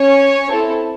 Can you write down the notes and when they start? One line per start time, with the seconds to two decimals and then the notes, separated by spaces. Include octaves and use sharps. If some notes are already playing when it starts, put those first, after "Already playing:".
Already playing: C#4 C#5
0.51 C4 E4 A4